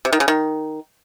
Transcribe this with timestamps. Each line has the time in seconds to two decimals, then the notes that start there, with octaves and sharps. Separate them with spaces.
0.05 C3
0.13 D#3
0.20 C#3
0.28 D#3